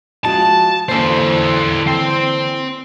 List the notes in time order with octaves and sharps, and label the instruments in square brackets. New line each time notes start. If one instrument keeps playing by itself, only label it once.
[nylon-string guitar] F3 G#3 F#4 [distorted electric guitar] A5
[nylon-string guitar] D3 E3 A#3 [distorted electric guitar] A4 C5
[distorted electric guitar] C4